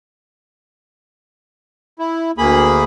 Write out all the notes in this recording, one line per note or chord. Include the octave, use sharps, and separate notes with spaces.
E4
D2 A#3 G#4 B5